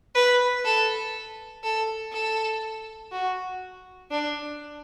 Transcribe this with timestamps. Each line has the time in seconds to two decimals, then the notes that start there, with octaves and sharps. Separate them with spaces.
0.15 B4
0.65 A4
1.63 A4
2.13 A4
3.12 F#4
4.11 D4